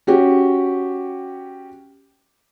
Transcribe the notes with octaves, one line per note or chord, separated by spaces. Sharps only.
C#4 F#4 G4